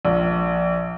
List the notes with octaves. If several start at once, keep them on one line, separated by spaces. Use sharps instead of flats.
A#1